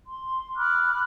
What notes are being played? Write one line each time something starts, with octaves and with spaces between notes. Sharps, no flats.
C6
B5 D6 F6 F#6